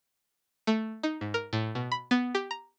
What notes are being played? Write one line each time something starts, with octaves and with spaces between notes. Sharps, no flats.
A3
D#4
G#2
A#4
A2
B2
B5
B3
G4
A#5